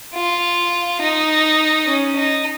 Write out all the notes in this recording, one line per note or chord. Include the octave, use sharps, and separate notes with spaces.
F4
D#4
C#4
D#4